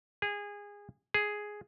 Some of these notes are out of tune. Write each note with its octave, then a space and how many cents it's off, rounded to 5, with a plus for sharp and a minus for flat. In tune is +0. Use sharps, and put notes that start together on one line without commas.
G#4 -20
G#4 +5